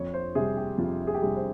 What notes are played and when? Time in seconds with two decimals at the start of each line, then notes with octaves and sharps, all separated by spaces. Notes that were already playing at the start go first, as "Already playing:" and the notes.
Already playing: F2 C#5
0.14 C5
0.35 C3 G3 G#4
0.57 G4
0.78 F2 F4
1.07 G#4
1.15 G4
1.22 C3 G3 G#4
1.36 C5